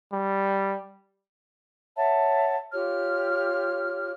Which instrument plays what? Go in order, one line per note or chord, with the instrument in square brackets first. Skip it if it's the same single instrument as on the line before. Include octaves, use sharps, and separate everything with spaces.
[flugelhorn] G3
[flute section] C#5 E5 F#5 A5
F4 G4 C#5 F6